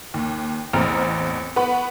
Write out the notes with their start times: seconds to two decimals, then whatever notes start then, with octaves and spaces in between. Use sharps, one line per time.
0.14 D#2
0.73 A1 E2 C4 A#5 F6
1.56 B3 B4 B5 C#6